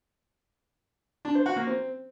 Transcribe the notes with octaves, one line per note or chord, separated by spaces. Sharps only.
D4
C5
F#4
A#3
C4